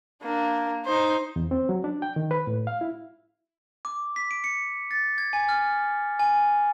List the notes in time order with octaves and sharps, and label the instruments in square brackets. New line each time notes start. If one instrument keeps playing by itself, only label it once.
[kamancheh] A#3 D4
D#4 C5
[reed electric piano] E2
C4
F#3
D4
G5
D#3
B4
A2
F5
E4
[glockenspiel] D6
B6
D7
C#7
A6
G#6
G#5
F6
G#5